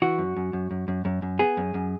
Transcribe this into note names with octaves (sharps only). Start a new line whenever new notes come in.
E3 F#4
F#2
F#2
F#2
F#2
F#2
F#2
F#2
B3 G#4
F#2
F#2